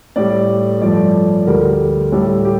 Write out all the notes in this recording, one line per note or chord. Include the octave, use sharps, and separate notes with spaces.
A2 G3 D5
G2 F3 A3 D5
D2 D3 G3 A#4
A2 G3 A4
G4